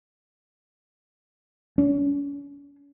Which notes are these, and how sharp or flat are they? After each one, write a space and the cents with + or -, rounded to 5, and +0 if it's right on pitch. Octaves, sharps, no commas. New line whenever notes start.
C#4 +40